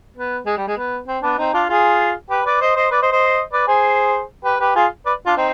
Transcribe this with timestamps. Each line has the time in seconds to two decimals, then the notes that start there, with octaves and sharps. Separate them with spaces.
0.16 B3
0.46 G#3
0.57 G3
0.68 G#3
0.77 B3
1.08 C4
1.23 B3 D4
1.38 C4 D#4
1.53 D4 F4
1.69 F4 G#4
2.30 G4 B4
2.45 B4 D5
2.61 C5 D#5
2.76 C5 D#5
2.91 B4 D5
3.02 C5 D#5
3.12 C5 D#5
3.53 B4 D5
3.68 G#4 C5
4.44 G4 B4
4.60 G4 B4
4.75 F4 G#4
5.06 B4 D5
5.26 D4 F4
5.37 C4 D#4